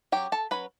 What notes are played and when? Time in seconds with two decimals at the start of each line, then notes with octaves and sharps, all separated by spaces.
0.12 F#3 C#4 G4 G5
0.32 A4 A5
0.51 F#3 C#4 B4 B5